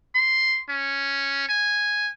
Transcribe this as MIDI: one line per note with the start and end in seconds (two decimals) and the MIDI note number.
0.15 0.62 84
0.69 1.46 61
1.49 2.10 80